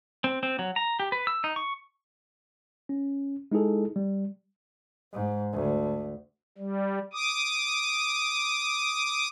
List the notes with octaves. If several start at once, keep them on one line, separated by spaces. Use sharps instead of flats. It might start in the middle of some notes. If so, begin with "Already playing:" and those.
C4
C4
F#3
A#5
G4
B4
E6
D#4
C#6
C#4
G#3 D#4 E4 G#4 A4
G3
G#2
D2
G3
D6 D#6